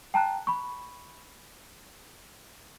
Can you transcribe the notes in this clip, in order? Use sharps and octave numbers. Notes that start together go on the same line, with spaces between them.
G5 A5 A#5 F#6
B5 C#6